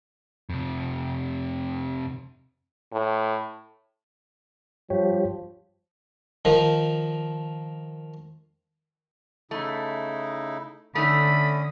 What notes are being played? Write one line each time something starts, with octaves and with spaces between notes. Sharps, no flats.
F2 C3
A2
G2 F3 G4 C#5
D#3 F3
C#3 A3 D#4 E4
D3 A3 C#4 D#4 E5 B5 D#6